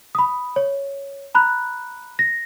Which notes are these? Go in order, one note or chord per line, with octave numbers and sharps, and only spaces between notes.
B5 D#6
C#5
A#5 B5 F#6
A#6